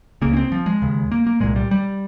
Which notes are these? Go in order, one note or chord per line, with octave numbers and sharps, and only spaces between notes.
C#2 C#3 A#3
C#4
C4
F3
G#3
D#2 C#3
A#3
A#3
C2 A#2 G#3
G3
G3